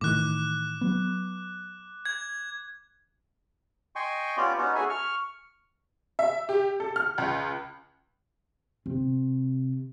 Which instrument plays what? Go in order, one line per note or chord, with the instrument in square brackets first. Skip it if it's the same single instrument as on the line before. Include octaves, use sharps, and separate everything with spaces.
[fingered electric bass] A2 D#3 E3 [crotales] D6 F#6
[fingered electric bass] F#3 B3
[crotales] G#6
[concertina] D#5 G5 G#5 C6 C#6
B3 C#4 F4 G4 D5
B3 C#4 D#4 F#4
F#4 G#4 A4 E5 G#5
C#6 F6
[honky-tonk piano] E5
G4
A4
F6
C#2
[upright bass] C3